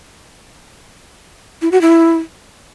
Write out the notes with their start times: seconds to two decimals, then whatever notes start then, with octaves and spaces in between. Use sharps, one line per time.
1.62 E4
1.72 F#4
1.82 E4